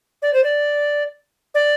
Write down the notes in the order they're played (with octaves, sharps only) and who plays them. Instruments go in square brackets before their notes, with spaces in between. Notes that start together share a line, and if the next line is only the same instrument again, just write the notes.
[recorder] D5
C5
D5
D5